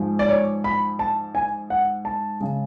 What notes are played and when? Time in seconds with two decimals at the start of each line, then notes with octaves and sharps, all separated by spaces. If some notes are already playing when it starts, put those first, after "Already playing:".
Already playing: G#2 F3 G#3
0.19 D5
0.29 C#5
0.64 B5
0.99 A5
1.35 G#5
1.70 F#5
2.05 A5
2.40 C#3 G#3